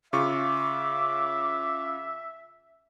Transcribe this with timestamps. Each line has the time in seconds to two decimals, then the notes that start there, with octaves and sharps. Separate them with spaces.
0.13 C#3 F4 E5 C#6 D6